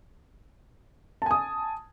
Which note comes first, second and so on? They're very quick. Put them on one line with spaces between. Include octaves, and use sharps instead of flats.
A5 G#5 D#6